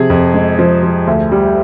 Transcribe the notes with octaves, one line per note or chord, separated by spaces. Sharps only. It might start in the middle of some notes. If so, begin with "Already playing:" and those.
Already playing: C3 F3 G#4
F2
G#3
F3
F3
D2
G3